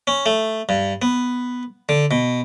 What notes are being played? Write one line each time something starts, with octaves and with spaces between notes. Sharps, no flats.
C#4
A3
G2
B3
D3
B2